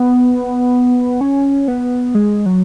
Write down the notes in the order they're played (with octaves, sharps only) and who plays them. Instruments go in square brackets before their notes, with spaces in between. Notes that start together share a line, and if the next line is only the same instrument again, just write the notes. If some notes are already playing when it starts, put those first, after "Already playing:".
Already playing: [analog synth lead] B3
C#4
B3
G#3
F#3